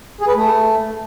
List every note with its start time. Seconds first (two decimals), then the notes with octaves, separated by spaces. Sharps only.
0.21 G#4
0.28 B4
0.35 A3